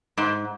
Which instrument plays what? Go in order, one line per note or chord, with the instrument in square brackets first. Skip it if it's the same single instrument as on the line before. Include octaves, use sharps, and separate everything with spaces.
[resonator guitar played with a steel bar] G#2